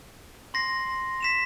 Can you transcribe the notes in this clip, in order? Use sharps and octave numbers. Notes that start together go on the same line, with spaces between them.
C6 A#6 C7
B6 E7 F7